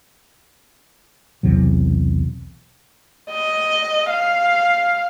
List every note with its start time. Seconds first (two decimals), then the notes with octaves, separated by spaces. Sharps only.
1.43 B1 E2 C3 F#3
3.32 D#5
4.10 F5